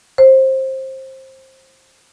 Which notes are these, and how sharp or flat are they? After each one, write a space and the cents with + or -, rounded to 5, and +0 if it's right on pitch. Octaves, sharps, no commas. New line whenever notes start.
C5 +20